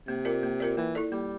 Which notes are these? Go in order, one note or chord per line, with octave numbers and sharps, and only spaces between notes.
C3 A#3
F4 A#4 D5
A#3
F4 A#4 D5
E3 A#3
E4 A4 D5
G3 A#3